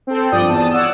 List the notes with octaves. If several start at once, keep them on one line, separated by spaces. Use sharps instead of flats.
C4 A4
G2 F3 D5 D#6 G6
E2 A5 D#6
C#5 D5 F#5 E6 E7